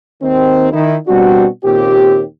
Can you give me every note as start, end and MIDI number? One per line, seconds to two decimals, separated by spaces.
0.22 0.68 39
0.22 0.68 51
0.22 0.68 60
0.72 0.96 51
0.72 0.96 63
0.72 0.96 64
1.07 1.46 47
1.07 1.46 55
1.07 1.46 60
1.07 1.46 62
1.07 1.46 66
1.64 2.22 39
1.64 2.22 46
1.64 2.22 49
1.64 2.22 60
1.64 2.22 67